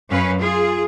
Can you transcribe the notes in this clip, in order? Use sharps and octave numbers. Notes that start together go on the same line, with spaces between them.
F#2 C#4 B4 F5
F4 G#4